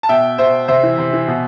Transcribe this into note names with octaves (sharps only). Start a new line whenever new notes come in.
A5
B2 E5 G5
B2 C5 E5
C3 C5 E5
E3
C3
E3
B2